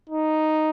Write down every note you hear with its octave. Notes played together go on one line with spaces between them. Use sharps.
D#4